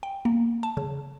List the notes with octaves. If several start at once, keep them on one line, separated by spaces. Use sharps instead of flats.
G5
A#3
A5
C#3